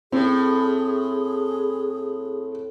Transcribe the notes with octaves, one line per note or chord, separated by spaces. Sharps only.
A2 C4 G#4